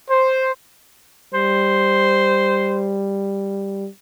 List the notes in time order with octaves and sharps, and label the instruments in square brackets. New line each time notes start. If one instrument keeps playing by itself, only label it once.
[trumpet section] C5
[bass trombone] G3 [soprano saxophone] C5